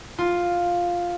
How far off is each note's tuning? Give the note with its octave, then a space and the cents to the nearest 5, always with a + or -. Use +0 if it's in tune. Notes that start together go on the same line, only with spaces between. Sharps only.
F4 +5